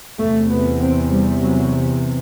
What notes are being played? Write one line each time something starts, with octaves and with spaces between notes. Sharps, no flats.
E2 C3 A3
B3
C4
G3
F#3